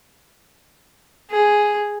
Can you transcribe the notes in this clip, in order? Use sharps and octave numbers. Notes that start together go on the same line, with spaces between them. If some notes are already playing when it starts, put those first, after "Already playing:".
G#4